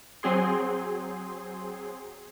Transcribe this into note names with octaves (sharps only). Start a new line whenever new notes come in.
F#3 C4 G#4 C6